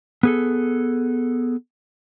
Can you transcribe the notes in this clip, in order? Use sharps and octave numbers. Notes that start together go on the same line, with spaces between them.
B3 G#4 A4